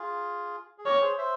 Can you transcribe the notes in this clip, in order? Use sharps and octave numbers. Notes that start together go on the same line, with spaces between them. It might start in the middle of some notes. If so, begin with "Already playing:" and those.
Already playing: F4 G#4
G#4
G4 A#4 C#5
G#4 C5
C5 E5